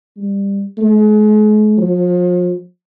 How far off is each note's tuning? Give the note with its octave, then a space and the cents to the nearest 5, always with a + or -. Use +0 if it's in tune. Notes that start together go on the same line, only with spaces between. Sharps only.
G3 +20
G#3 +40
F3 +35